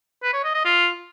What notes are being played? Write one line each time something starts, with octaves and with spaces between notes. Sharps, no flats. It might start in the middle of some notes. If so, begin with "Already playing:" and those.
B4
C#5
D#5
D#5
F4